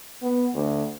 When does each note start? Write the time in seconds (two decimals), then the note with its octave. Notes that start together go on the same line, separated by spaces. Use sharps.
0.22 B3
0.54 D2